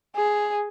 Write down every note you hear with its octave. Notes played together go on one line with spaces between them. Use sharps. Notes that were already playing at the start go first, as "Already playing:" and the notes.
G#4